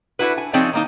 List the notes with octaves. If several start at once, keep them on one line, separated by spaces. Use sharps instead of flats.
D4 E4 F#4 B4
G#5
F3 C4 D#4 G#4 C#5 D5
D#3 A#3 D#4